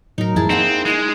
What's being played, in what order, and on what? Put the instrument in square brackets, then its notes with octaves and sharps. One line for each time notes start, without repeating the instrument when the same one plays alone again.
[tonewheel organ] A2 F#3 [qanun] D#4 A#4
[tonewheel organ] F#2 E3 F3 [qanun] E4 G#4 A5
[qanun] A#3 F#5 B5 [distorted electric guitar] C4 [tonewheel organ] D#4
[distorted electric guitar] G#3 [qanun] G#5 A#5 B5